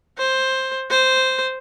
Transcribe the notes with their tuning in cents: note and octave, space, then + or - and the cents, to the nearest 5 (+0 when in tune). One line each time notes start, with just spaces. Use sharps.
C5 +10
C5 -5